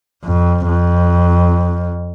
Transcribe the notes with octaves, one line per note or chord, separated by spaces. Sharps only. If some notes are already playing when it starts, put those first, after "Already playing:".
F2
F2